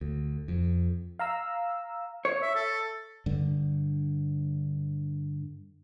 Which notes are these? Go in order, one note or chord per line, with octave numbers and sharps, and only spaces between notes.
D2
F2
F5 A#5 E6
C#5
E5
A4
G2 D3